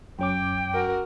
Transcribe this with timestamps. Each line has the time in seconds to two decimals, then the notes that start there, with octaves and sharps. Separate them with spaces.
0.19 F#2 C#4 G5 D6
0.73 F#4 A#4